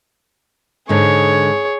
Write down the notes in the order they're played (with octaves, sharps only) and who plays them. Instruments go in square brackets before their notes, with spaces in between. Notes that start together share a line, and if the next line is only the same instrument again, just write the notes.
[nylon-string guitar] G#2 D3 [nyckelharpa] G#4 C#5